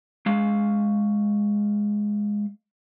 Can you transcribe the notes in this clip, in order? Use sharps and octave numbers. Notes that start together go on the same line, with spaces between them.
G#3 F5